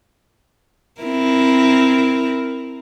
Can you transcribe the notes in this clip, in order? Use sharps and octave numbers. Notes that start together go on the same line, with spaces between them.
C4 E4 A#4